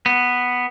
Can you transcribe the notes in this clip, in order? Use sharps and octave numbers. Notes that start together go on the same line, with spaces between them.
B3